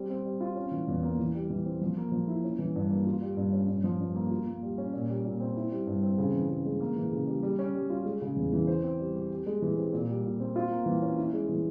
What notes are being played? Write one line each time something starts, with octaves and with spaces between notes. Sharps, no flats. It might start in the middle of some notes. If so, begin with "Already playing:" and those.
Already playing: G3 C4
C4
G3
F4
C#4
E3
E2
A#3
E3
G3
E3
C4
F3
A#3
F3
E4
C#4
E3
G2
A#3
F4
G3
G2
C#4
G2
F3
G2
A#3
F4
A#3
G3
C#4
A#2
G3
A#2
C4
E4
G3
G2
C4
C#3
E3
C#3
G#3
A#3
E3
C#3
G3
G3
C#4
G3
F4
G#3
C#3
E2
E3
C5
C4
G3
G4
G4
G#3
E3
C4
A#2
G3
A#2
C4
F4
A#3
E3
C#4
E4
G#3
E3